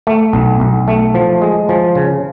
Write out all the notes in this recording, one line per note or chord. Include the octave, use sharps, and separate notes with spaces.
A3
B1
B1
A3
F3
G#3
F3
C#3